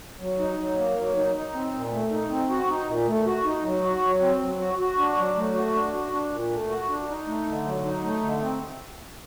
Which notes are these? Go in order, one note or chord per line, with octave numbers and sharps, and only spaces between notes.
F#3
D#4
F#3
A#3
F#3
D#4
D#4
C4
A#2
A3
D#4
C4
F#4
D#4
A#2
A3
F#4
D#4
F#3
F#4
F#3
C4
F#3
F#4
F#4
D4
F#3
A3
F#4
D4
F#4
D4
A#2
A3
F#4
D4
D#4
A3
D3
F#3
D#4
A3
D3
C4